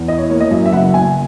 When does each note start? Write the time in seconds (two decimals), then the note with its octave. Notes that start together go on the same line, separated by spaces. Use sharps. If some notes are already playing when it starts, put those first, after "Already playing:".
Already playing: E2
0.08 E4 D#5
0.18 C#5
0.30 A#3 C#5
0.40 D#5
0.51 F#2 E5
0.65 E5
0.73 F#1 F#5
0.94 F#1 G#5